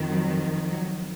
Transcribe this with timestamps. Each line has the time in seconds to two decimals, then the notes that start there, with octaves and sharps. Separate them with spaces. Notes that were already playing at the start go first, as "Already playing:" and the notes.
Already playing: F2 D#3
0.08 F#3
0.71 F#3